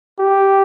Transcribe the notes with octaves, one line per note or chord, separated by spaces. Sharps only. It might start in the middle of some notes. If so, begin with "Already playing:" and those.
G4